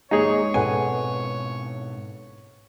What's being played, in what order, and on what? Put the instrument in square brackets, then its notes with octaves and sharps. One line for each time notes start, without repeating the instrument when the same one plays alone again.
[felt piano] D#2 G#2 G#3 [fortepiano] D#4 G#4 [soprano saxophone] C#5
[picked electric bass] G#2 B2 C4 [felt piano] A4 B4 F#5 [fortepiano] G#5